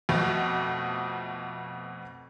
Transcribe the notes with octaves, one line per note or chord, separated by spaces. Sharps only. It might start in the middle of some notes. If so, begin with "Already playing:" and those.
F2 B2 A3